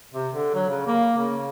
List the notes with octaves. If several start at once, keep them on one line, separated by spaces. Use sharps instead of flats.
C3
D3
F#3
C#3
A#3
C#3